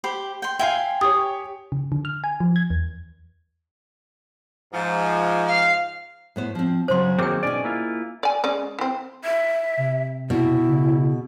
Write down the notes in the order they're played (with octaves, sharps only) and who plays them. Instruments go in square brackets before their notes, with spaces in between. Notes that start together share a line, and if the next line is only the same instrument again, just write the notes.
[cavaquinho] G4 C5 B5
G5 C6
[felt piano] E5 F5 [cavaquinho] G5 G#5 C6
[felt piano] G4 C#5 [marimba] D#6
[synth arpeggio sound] C#3
D3
F6
G#5
F3
G#6
E2
[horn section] G#2 F3
[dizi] F5
[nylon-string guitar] A2 B3 C5
F3 C4
[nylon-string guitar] F#2 C#3 F#3 [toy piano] C5 C6
[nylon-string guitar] D#3 [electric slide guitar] F#3 A#3 C4 [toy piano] G#4 G5
[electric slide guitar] B2 C#4 D5 [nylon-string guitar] D#4 G#5
[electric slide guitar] A#3 E4 F4
[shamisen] D5 G#5
G#3 C#4 D5
E3 C4
[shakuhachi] E5
[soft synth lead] C3
[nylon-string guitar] B2 [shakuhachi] E4
[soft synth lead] C#3